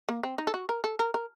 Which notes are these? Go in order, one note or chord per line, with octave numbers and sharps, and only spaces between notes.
A#3
C4
D#4
A4
F#4
A#4
A4
A#4
A#4